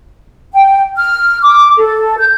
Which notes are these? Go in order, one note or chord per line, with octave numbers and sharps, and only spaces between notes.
G5
F6
D6
A4
G6